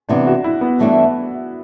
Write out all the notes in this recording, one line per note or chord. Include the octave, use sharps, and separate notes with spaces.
C3 E3 B3 D4
F#4
E4
B3
G2 E3 A3 D4